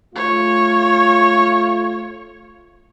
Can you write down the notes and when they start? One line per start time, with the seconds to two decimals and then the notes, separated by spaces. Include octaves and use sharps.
0.15 A3 F4 C#5